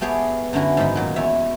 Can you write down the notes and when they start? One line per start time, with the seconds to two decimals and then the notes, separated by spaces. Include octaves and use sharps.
0.01 A3 B3 G4 G#4 C#5
0.53 F#2 D3 C#4 E4 F#4
0.77 G#2 D#3 F#3 D#4 B5
0.95 A#2 F#3
1.16 E2 E4 C#5 E5